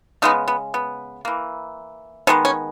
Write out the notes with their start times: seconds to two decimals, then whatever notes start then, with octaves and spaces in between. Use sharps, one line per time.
0.22 C#3 G#3 B3 D#4
0.48 B3
0.74 B3
1.25 E3 A#3
2.27 D#3 G#3 B3 C#4
2.45 C#4